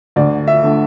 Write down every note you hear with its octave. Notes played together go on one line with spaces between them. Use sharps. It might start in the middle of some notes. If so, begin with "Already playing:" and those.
D2 D5
E5
D3 A3